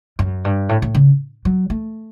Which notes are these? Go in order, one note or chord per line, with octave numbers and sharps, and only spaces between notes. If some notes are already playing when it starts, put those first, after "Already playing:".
F#2
G2
A2
A2
C#3
F#3
A3